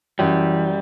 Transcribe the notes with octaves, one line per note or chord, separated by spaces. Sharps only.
F#2 E3 G3